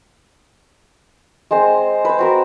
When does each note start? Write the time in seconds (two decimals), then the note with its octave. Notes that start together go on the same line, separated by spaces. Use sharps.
1.51 G#3 C4 C5 D#5
2.05 B4 C5
2.19 C4 F#4 A#4